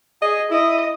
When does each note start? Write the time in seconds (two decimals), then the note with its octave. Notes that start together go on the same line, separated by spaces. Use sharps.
0.22 G#4 D#5
0.51 E4 D#5